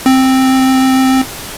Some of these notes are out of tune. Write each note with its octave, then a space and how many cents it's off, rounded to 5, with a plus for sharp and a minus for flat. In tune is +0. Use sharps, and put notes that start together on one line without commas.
C4 +5